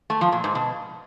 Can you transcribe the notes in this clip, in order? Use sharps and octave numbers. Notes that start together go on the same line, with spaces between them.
A3
F3
A#2
G#2
B2